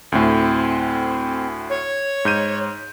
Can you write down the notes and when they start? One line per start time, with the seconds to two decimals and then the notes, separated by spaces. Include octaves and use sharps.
0.12 D2 A2 C4
1.70 C#5
2.25 G#2 G6 D#7